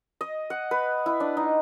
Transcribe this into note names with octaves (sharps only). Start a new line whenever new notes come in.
D#5
F#5
B4
E4
D4
D#4